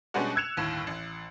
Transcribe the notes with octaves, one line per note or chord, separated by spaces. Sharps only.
B2 G3 G#3 C#4 D4 F#4
E6 F#6 G#6 C#7 E7 F7
G1 D#2 A2 E7
A1